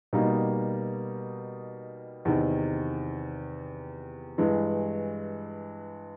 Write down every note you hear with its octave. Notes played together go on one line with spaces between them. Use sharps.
B2 G3 A#3 D#4
E2 C3 D#3
G2 E3 G#3